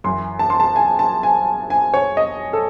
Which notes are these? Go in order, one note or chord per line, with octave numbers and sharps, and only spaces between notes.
F#2 E3 C6
A5
C6
A5
G#5
A5
G#5
G#5
C#5
D#5
A4